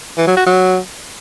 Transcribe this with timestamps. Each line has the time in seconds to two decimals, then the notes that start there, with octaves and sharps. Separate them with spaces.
0.18 E3
0.27 F#3
0.37 F#4
0.46 F#3